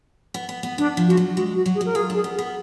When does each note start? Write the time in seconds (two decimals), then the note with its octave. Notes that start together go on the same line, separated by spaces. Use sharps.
0.34 B3
0.49 B3
0.63 B3
0.78 B3 D4
0.97 F3
1.07 G#3 F#4
1.17 F#3
1.37 G#3 F#4
1.55 F#4
1.66 F#3
1.75 G#4
1.81 F#3 A#4
1.95 F4 G#4
2.10 D4 G#4
2.24 B3
2.34 G#4
2.39 B3